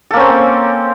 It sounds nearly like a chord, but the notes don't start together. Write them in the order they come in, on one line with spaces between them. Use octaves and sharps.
A4 A#3 C#4 C4